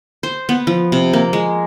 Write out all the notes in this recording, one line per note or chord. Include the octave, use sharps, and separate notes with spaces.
C5
B3
F3
C3
A#3
G#3